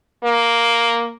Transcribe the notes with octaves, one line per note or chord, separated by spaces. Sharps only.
A#3